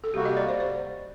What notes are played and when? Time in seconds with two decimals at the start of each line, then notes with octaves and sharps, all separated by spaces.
0.04 A4
0.13 C3 G3 A#3 F#4 G4
0.25 D#5
0.37 D5
0.49 C5
0.60 C5